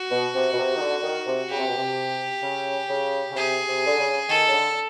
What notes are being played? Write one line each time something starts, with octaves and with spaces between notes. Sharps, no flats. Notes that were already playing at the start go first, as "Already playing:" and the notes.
Already playing: F#4
B2
C3
B2
C3
D#3
D3
D#3
C3
C#3 G4
C3
B2
C3
C#3
C#3
C#3
C3 G#4
C3
D3
C#3
D#3 A4
C#3
D3